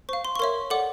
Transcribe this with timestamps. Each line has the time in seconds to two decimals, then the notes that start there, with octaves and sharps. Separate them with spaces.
0.09 C5 F5 C#6
0.25 C6
0.36 C#6
0.39 A#4 C#5 E5 C6
0.70 A4 D5 F#5 D6